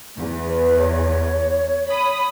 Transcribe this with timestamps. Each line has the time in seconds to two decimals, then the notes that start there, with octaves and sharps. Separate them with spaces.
0.17 E2
0.49 B4
0.79 C#5
1.89 B5 D#6